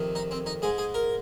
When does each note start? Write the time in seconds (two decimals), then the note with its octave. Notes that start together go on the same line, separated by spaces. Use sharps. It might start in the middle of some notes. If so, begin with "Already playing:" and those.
Already playing: F2 C3 D#3
0.15 D#4
0.31 C4
0.46 D#4
0.62 G#2 G#3 G#4
0.78 G#4
0.94 A#4